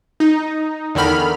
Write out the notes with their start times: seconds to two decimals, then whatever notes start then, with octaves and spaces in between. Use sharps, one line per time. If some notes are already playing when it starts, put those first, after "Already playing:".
0.20 D#4
0.95 E2 D3 D#3 B5 F6